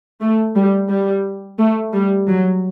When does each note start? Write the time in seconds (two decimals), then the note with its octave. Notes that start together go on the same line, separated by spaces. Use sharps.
0.21 A3
0.56 G3
0.89 G3
1.59 A3
1.93 G3
2.27 F#3